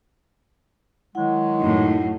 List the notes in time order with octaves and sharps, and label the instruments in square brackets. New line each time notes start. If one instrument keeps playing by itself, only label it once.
[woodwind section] D#3 F#3 G#3 [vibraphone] E4 F#5
[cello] F#2 A2 [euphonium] D#4